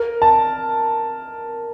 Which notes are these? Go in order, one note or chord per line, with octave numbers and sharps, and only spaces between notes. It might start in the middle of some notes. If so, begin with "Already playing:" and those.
Already playing: A#4
A5